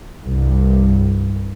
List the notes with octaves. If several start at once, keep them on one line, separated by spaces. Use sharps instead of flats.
C2 G2